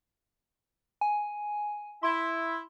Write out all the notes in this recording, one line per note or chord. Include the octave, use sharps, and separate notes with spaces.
G#5
E4 C6